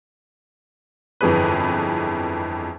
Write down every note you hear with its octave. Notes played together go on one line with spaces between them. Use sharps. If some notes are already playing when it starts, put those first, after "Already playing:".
G1 F2 E3 G#4 B4